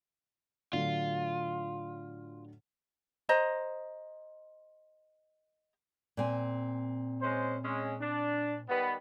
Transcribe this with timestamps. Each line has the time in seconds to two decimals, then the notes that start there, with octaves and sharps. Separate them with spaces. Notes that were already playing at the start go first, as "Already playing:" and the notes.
0.73 A2 D3 F#3 F4
3.29 C5 D#5 A#5
6.17 A#2 C4 G#5
7.21 G#3 C#4 C5
7.62 G#3 C#4
8.00 D4
8.69 D#3 G3 B3